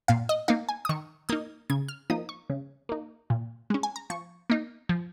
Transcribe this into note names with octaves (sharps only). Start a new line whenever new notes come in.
A#2 F5
D#5
A#3 D#4 F5
G#5
D#6
D#3 C#6
A#3 D#4 D#6
C#3 G#6
F6
F3 A#3 D#4 D#6
C#6
C#3
A#3 D#4
A#2
G#3 C#4
G#5
A#5
F3 C#6
A#3 D#4
F3